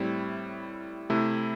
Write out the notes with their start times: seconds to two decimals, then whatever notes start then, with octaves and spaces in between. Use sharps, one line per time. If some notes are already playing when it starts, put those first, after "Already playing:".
Already playing: A2 G3 C4 E4
1.10 C3 A3 E4